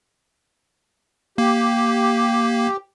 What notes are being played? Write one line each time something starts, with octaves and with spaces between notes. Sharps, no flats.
A#3 G4